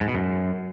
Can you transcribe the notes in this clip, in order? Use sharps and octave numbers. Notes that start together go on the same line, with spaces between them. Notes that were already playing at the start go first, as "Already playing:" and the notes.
G#2
B2
F#2